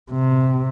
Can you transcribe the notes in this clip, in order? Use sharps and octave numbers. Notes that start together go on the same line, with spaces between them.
C3